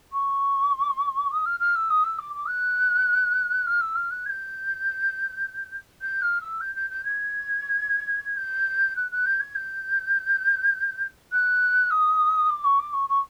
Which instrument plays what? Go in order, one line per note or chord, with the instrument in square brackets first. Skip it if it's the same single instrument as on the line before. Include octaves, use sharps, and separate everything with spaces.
[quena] C#6
D#6
F6
F6
E6
D#6
E6
D6
D6
F#6
F6
E6
F6
F#6
G#6
G6
G6
F6
E6
G6
G6
G6
G#6
G6
F#6
F#6
G6
G#6
G6
F#6
D#6
D6
C#6
D6
C#6
C#6